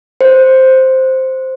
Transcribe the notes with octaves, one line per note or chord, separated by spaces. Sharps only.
C5